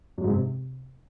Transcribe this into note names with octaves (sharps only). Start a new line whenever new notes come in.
F#2
G#2
C3